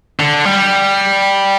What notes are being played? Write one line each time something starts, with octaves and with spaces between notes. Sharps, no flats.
D3
G3